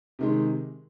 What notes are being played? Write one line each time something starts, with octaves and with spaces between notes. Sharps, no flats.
C3 D#3 G#3